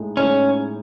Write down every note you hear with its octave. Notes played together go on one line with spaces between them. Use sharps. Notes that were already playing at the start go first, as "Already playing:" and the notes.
Already playing: A2 G#3 D#4
A2 G#3 C#4 D#4